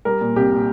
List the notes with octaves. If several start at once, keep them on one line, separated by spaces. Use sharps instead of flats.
G3 A#4
A#2
C2 G4
A#2